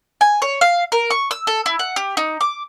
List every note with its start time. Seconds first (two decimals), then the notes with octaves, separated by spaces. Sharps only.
0.21 G#5
0.42 C#5
0.61 F5
0.92 A#4
1.10 C#6
1.31 E6
1.47 A4
1.66 E4
1.79 F#5
1.96 G4
2.17 D#4
2.41 D6